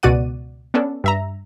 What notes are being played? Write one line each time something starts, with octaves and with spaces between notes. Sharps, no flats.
C#2 B2 F#4 D5 F#5 D#7
B3 C#4 D4 A4
G2 E5 A#5